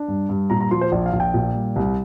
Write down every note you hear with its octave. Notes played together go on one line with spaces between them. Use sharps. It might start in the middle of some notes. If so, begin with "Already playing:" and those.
Already playing: D4
G2
G2
A#2 A#5
A#5
F3 C6
C5
A#1 D5
F5
A#1
G5
A#2
G3
C2